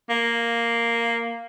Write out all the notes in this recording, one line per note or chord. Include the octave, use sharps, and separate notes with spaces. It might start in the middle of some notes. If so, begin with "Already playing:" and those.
A#3